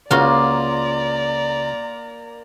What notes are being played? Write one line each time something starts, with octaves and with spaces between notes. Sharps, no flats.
C#2 A#3 F4 F#4 D5 A#5 C6